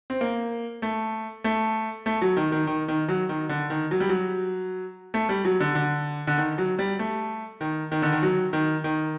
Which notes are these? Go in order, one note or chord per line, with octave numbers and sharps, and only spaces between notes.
C4
A#3
A3
A3
A3
F#3
D#3
D#3
D#3
D#3
F#3
D#3
D3
D#3
F#3
G3
F#3
A3
G3
F#3
D3
D3
D3
D#3
F#3
G3
A3
D#3
D#3
D3
D#3
F#3
D#3
D#3